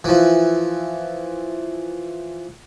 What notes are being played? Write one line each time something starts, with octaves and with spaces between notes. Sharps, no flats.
E3 F3